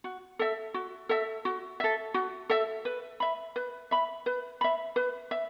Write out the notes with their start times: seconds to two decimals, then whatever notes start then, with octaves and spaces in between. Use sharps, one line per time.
0.04 F#4
0.39 A4 E5
0.74 F#4
1.09 A4 E5
1.45 F#4
1.80 A4 E5
2.14 F#4
2.49 A4 E5
2.85 B4
3.20 E5 B5
3.56 B4
3.91 E5 B5
4.26 B4
4.61 E5 B5
4.96 B4
5.31 E5